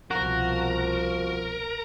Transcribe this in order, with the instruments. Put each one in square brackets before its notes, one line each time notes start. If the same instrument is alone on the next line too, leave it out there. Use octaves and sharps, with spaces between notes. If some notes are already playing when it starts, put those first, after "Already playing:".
[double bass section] C2 B2 [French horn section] F3 [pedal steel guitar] F#4 [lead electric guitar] A#4